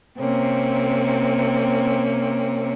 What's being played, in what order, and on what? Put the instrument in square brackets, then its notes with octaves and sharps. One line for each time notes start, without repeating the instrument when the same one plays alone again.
[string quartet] C3 A#3 C4 C#4